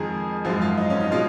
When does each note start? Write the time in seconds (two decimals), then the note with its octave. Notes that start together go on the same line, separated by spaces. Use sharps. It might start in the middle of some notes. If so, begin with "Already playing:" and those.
Already playing: F2 D#3 G#3 G#4 A#4
0.45 G#1 F#2 F3 G#3 F4
0.61 F4
0.78 D#4
0.90 C#4
1.00 D#4
1.12 B2 G#3 F4